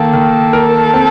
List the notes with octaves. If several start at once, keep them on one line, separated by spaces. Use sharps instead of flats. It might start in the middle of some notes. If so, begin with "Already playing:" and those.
Already playing: D#3 A#3 A4
D#3
A#4
C4